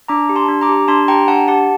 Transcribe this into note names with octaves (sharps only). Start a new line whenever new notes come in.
D4 A#5 D6
G4
A5 C6
D4
A#5 D6
G4
D4 A5 C6
G4 G5 A#5
D4 F#5 A5
G4 F#5 A5